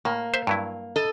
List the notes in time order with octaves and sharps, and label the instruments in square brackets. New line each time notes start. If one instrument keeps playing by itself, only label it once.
[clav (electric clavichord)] A2 [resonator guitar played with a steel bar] A#3
[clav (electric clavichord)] C5 E5
G2 F#3 E4
[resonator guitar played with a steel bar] A4 D#5